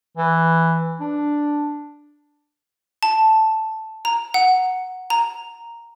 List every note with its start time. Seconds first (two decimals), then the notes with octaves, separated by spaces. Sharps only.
0.18 E3
1.00 D4
3.03 A5
4.05 A#5
4.34 F#5
5.10 A#5